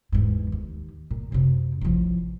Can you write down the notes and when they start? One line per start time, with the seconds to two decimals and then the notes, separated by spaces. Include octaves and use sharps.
0.12 E2 G#2
0.52 D#2
1.11 A#2
1.32 F#2 C3
1.81 A1 F3